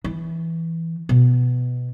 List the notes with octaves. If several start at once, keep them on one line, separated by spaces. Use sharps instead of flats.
E3
B2